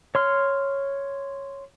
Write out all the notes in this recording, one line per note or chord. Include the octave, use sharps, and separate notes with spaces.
C#5 C6 F6